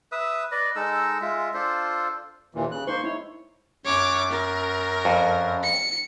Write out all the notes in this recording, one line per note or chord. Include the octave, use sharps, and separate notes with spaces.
B4 E5 D#6 E6
B4 D5 D#5
G#3 D#4 A4 E6
G#3 F4 E5
D4 F4 A4 C5
D#2 A#2 E3
C#3 F#6
A#3 D#4 C5 C6 C#6
D#4 E4 C#5
F#2 C#5 D6
A#4
F2
C#7